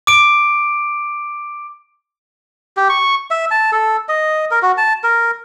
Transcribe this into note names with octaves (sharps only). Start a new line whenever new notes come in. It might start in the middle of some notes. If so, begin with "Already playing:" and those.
D6 D7
G4
C#6
E5
A5
A4
D#5
A#4
F#4
A5
A#4